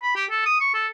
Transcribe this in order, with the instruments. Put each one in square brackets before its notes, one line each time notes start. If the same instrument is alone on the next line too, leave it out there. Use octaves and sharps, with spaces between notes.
[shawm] B5
G4
A4
D#6
C#6
A4